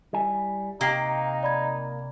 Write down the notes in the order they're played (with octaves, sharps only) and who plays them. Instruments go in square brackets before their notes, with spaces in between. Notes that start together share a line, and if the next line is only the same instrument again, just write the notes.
[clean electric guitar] G3 E4 G#5
[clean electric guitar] C3 G5 [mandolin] A#3 [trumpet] D#4 [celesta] G4 C7
[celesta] D5 B5 G#6